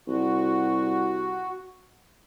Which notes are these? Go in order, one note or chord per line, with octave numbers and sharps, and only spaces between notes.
C2 F#4